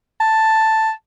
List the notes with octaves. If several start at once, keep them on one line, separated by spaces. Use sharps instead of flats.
A5